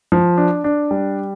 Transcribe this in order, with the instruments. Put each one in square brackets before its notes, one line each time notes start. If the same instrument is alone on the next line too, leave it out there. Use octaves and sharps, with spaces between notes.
[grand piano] F3
D4
D4
G3